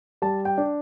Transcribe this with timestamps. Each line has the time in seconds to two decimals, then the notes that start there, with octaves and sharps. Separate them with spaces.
0.22 G3 A5
0.45 G5
0.58 D4